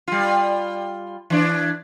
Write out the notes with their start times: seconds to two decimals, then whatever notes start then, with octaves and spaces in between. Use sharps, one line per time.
0.08 G3 F4
1.30 E3 D4